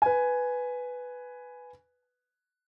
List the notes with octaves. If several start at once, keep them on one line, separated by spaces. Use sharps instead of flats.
B4 G#5